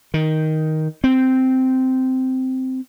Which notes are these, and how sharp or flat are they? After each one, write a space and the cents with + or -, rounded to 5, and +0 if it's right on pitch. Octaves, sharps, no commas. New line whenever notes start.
D#3 +10
C4 -10